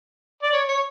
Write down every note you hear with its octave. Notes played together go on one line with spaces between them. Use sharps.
D5
C#5
C#5